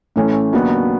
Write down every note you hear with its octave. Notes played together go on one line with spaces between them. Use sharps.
A2 E3 A3 C#4
D#2 C#3 F#3 B3 D4